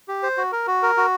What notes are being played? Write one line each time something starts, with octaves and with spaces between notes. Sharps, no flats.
G4
C5
F#4
A#4
F#4
A#4
F#4